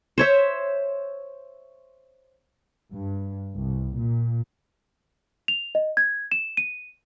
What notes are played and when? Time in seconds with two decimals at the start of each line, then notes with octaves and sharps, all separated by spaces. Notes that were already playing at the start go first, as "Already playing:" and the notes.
0.18 C5 C#5 E5
2.90 G2
3.56 C2
3.96 A#2
5.48 F7
5.75 D#5
5.97 G#6
6.32 E7
6.57 D#7